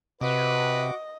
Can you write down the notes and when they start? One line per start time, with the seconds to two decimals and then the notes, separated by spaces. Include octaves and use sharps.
0.21 C3 F#4 B4 D#5 D6